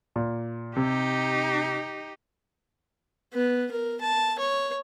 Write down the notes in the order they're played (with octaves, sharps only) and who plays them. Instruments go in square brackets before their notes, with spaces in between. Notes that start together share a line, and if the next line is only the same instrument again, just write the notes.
[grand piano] A#2
[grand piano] C3 [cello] D#4 G4
[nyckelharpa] B3
A#4
A5
C#5